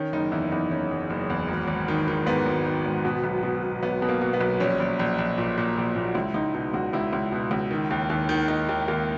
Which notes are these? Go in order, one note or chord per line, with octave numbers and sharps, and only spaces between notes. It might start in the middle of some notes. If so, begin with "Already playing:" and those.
Already playing: D#3 C#4
F#1 D#4
E2 E4
E2 D#4
F#1 C#4
F#1
F#1
E2
G#1
G#1
D#3
D#3
G#2 B3
G#1
D#3
G#1
B2
B1
B2
B2
B1 B3
B2
A#3
B2
B3
B1
A#1 C#4
A#1
A#1
A#1
A#2
A#2
A#1
A#2
F#4
C#2 E4
C#2 D#4
B2 D#4
C#2 F#4
C#2 E4
C#2
B2
C#2
D#3
D#2
D#2
D#3
D#3 D#4
D#2
D#2 A#3